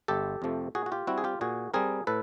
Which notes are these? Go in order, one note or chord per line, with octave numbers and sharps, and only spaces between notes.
G1 G4 A4
F2 C3 F3 A3
A#2 F#4 G#4
F#4
F4 G4
G3 C4 E4 F#4
G#4
F4 G4
A#2 F#4 G#4
G3 C4 G#4 A#4
A2 A4 B4